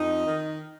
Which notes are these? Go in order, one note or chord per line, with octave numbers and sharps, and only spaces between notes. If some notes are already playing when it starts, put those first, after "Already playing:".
Already playing: F2 D#4
D#3